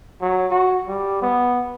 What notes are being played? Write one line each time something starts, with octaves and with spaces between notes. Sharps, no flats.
F#3
F#4
G3
B3